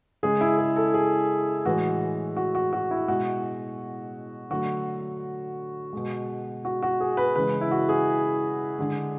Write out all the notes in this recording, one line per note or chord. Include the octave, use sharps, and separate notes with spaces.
C#3 G#3 G#4
E4
G#4
A4
G#4
A2 E3 G#3 F#4
F#4
F#4
F#4
E4
B2 G#3 F#4
D3 F#3 A3 F#4
B2 G#3
F#4
F#4
G#4
B4
C#3 E3 G#3 B4
E4
F#4
G#4
D3 G#3